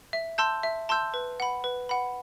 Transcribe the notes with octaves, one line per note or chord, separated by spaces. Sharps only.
E5
A5 C6 E6 G6
E5
A5 C6 E6 G6
B4
F#5 B5
B4
F#5 B5